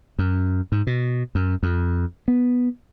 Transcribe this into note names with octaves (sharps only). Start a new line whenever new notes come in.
F#2
G#2
B2
F#2
F2
B3